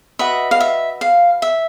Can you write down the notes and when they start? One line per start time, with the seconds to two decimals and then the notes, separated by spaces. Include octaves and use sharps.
0.19 F#4 B4 D#5 E5
0.51 F5
0.60 E5
1.01 F5
1.42 E5